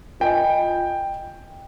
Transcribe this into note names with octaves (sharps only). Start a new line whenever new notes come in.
F4 A#4 D#5 G5 G#5